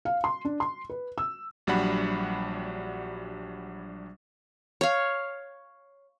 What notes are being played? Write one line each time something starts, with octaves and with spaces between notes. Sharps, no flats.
F5
C6
D4
C6
B4
E6
A#1 F#3 G3 D4 F#5 B5
C#5 F5